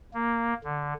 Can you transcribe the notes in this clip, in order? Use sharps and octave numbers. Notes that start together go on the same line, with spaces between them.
A#3
D3